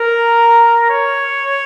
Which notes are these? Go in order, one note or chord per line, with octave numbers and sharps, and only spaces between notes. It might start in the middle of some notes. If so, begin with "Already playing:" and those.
Already playing: A#4
C#5